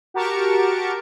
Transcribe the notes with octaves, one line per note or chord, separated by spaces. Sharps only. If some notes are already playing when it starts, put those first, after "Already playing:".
F#4 G4 A#4 A5 C#6 D7